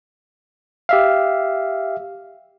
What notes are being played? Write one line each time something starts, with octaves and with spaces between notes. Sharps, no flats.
G4 E5 F5